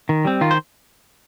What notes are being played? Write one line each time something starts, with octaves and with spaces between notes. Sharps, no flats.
D#3
G3 C4
D#3 F4
C5